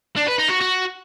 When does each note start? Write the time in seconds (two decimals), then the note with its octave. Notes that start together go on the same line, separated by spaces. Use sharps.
0.17 D4
0.28 B4
0.39 D#4
0.50 F#4
0.61 F#4